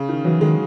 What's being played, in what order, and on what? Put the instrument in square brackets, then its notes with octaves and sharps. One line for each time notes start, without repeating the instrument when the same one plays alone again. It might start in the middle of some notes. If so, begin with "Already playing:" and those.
Already playing: [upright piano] C#3
D#3
[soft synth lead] E3 [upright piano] F#3
[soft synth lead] D#3 [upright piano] G#3